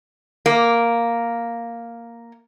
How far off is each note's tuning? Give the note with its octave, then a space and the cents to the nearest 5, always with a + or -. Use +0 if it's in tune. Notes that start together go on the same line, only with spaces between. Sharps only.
A#3 +0